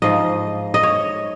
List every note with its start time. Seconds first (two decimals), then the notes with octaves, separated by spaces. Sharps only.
0.02 G#2 F3 D#5
0.74 D#5
0.83 C#5